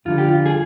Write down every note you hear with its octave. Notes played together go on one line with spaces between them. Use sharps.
F2 D3 G3 F4
G4
F4
G#4